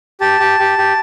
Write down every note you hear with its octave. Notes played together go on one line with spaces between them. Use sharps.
G4 A5
G4
G4
G4